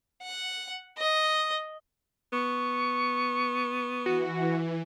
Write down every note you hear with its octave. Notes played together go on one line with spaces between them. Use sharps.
F#5
D#5
B3 C#6
E3 F#4